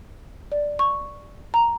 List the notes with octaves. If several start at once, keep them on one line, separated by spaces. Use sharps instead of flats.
D5
C#6
A#5